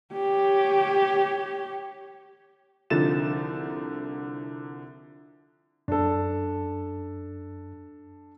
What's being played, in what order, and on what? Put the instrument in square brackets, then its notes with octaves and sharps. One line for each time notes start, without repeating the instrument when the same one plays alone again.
[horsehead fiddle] G4 C#5
[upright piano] C2 D3 F3 D#4 A6 E7
[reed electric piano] F#2 [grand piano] D4 A4